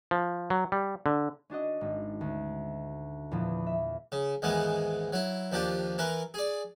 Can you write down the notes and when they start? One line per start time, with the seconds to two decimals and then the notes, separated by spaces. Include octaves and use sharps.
0.11 F3
0.50 F#3
0.72 G3
1.06 D3
1.50 C#4 D4 F#4 D#5
1.81 G#1
2.21 D2
3.31 E2 A#2 E3 F3
3.67 E5
4.12 C#3
4.42 D#2 G#2 E3 G#3 B3
5.13 F#3 E4
5.52 D#2 F3 D4 F4 G4
5.98 E3 A#4 B4
6.34 G#4 D5